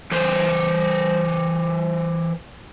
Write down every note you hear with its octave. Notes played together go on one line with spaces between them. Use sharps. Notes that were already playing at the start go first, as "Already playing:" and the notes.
E3 B4 C5